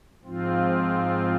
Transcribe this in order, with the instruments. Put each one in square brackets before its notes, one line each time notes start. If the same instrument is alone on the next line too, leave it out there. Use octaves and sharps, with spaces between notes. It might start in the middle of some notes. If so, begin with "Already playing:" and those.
[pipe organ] G#2 F3 C4 F4